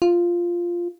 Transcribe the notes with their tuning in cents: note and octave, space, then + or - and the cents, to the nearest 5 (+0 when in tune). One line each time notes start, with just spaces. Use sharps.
F4 -5